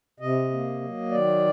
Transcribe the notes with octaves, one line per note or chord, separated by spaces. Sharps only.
C3 D#5
A#3
F#3
D#3 D5